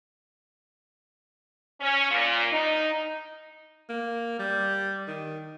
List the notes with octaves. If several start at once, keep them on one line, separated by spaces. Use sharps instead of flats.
C#4
A#2
D#4
A#3
G3
D#3